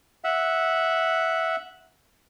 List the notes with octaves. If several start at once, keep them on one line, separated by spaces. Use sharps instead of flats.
E5 F#5